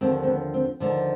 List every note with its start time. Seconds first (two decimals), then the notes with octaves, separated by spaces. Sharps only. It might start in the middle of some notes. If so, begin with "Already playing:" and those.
0.01 D#2 D3 F3 C4
0.23 C4
0.27 B3
0.54 C4
0.80 D#2 D3 F3